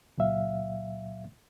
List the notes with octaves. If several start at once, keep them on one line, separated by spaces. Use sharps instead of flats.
C#2 A#2 F#3 E5 F5